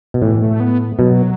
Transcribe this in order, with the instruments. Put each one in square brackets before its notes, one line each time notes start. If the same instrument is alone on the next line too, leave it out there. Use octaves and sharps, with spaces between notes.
[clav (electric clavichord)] B2
[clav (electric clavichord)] A2 [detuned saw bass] E3
[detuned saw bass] A3
B3
[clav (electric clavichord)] B2 [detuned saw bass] F#3